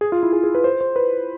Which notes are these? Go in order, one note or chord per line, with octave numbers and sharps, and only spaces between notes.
G#4
F4
E4
G#4
G#4
B4
C5
C5
B4